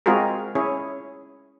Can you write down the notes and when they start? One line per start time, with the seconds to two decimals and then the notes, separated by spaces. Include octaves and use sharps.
0.06 G#3 C4 F4 F#4 G#4 A#4
0.55 C#4 E4 G#4 C#5